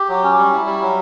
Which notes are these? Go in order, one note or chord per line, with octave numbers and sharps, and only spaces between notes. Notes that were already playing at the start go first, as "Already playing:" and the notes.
Already playing: G4
F#3
C#4
G3
E4
G3
F#3